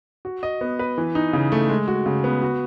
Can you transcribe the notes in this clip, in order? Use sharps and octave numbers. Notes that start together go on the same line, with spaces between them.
F#4
D#5
B3
B4
E3
D#4
C#3
A3
G#3
F#4
C#3
B3
F#4